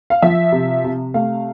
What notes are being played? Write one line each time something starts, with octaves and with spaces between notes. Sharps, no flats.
F5
F3 E5
C3
C3
A3 F5